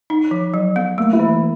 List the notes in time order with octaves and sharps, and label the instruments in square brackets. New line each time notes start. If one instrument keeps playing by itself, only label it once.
[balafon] D#4
F3
F#3
B3
[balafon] A3 [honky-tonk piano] A#3
[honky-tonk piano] E4
[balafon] E3